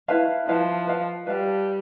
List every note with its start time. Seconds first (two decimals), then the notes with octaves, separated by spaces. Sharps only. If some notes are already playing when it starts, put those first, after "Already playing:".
0.08 E4 B4 F5 A5
0.48 F3 E4 B4 F5 A5
0.87 B4 F5 A5
1.27 G3 B4 F5 A5